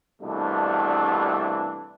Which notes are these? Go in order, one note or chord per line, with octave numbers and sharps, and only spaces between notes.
C2 G2 B2 E3 A3 D4